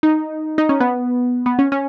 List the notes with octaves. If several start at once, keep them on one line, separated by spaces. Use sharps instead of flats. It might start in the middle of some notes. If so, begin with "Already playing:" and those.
D#4
D#4
C#4
B3
B3
C#4
C#4